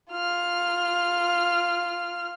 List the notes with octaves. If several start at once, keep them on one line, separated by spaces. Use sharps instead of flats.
F4 F6